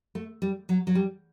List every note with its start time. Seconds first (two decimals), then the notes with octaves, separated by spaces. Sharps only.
0.15 A3
0.42 G3
0.69 F#3
0.87 F#3
0.95 G3